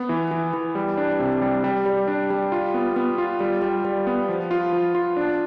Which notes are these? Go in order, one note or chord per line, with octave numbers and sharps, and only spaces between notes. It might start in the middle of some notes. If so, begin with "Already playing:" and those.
Already playing: B3
E3
E3
E3
G3
D4
C3
G3
G3
G3
D4
G3
F4
B3
B3
F4
G3
G3
G3
B3
F3
F4
F3
F4
D4